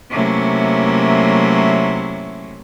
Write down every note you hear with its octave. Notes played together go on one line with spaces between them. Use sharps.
C3 F#3 A3 A#3 C#4 E4